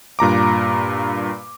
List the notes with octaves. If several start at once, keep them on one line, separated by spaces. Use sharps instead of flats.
G2 A#2 A#5 D6